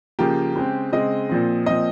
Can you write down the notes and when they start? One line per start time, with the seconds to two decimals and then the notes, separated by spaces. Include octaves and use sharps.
0.19 C#3 F3 A#3 G4
0.55 C#3 G#3 C4
0.93 C#3 G#3 C4 D#5
1.29 A#2 F3 C4
1.66 A#2 F3 C4 D#5